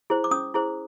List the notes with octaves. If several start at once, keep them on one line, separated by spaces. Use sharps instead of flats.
E4 G#4 C5
D6
C#4 D#6
E4 G#4 C5